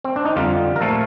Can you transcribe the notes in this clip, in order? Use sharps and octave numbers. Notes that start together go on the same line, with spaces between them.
C4
D4
D#4
F2 D3 G3 F4
A#4
A#2 F3 A3 A4